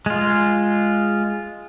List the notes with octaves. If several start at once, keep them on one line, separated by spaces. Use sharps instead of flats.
G#3 F4